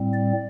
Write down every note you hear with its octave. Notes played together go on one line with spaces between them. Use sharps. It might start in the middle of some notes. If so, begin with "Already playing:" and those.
Already playing: A2 G3 C4
D5